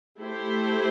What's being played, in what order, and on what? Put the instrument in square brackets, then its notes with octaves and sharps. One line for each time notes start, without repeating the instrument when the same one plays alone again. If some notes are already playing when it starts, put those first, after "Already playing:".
[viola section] A3 E4 G4 C5